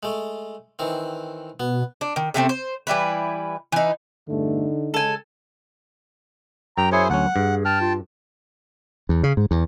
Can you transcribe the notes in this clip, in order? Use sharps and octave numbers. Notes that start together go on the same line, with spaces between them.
G#3 A3
D#3 E3 C4
B2 B3
D4
D#3
C3 A3 B3 C4
C5
E3 G3 E4 B4
E3 D#4
E2 G2 D3 A3 D#4
C#3 G#3 A4 G#5
F#2 G5 A#5
E4 G#4 C5 C#5
D2 F#3 C#4 F#5
G2 G#4
G5 A5 F6
F4
E2
C#3
G#2
E2